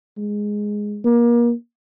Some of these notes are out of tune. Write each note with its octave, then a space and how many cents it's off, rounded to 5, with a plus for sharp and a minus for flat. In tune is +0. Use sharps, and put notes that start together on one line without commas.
G#3 +0
A#3 +30